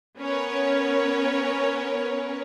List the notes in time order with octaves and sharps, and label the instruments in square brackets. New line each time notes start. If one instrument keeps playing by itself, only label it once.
[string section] B3 C#4 A#4 B4 C#5